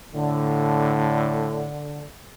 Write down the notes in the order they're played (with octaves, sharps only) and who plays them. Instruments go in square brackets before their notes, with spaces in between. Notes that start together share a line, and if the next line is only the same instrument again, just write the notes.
[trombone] A2 [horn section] D3